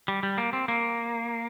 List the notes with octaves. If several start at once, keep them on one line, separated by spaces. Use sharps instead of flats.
G3
G3
A#3
C4
A#3